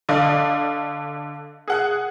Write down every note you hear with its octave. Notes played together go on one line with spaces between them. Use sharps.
D3 D5 D#5 F5
G#4 F#5 F#6